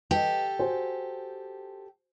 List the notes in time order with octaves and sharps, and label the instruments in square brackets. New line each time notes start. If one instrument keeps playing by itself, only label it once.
[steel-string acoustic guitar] G4 A4 [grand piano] B4 D#5
[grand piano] F#4 C5 G#5